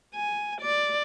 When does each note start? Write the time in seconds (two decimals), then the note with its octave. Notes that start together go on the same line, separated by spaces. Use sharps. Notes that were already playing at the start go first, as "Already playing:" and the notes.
0.14 G#5
0.61 D5